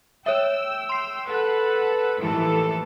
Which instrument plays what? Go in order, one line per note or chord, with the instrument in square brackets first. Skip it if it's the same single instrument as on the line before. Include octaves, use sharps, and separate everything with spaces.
[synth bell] C#5 E5 [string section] G5 E6
[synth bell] C6 C7
[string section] A4 B4 F#5
[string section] D#2 A2 F3 [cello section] E3 A4